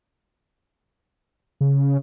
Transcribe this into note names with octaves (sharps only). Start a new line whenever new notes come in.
C#3